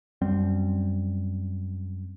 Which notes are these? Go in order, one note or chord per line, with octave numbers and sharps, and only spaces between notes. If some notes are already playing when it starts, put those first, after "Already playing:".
F#2 G3 C4